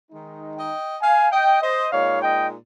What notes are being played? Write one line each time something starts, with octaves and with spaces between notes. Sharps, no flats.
D#3 G#3 D#4
D#5 G5
F5 G#5
D#5 G5
C5 D#5
A#2 G#3 D#4 C#5 F5
D#5 G5